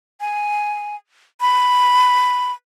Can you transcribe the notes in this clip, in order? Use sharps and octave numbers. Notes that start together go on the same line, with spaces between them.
G#5
B5